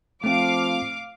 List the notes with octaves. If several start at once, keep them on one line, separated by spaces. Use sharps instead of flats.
F3 A3 C4 F5 D6